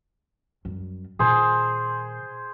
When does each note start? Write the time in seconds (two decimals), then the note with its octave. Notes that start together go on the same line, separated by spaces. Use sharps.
0.65 F#2 G3
1.19 A#2 D#3 G#4 C5